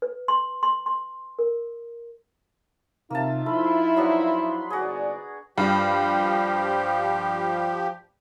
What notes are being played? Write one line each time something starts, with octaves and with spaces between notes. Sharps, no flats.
B4
C6
C6
C6
A#4
C3 A#3 D#4 F4 E5 A5
F3 E4 A4 B5 C6
F#3 B3 D4
G1 C2 G#2 F#4 G#4 D5
G2 F3 G4